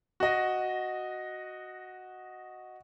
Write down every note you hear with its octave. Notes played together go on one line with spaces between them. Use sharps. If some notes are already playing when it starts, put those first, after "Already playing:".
F#4 D#5